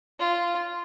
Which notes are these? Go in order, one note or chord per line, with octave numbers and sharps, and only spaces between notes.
F4